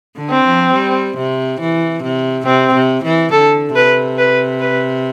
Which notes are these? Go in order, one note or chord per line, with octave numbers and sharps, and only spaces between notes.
D3
C4
F3
G3
C3
E3
C3
C3 C4
C3
E3
D3 A4
C3 B4
B4
B4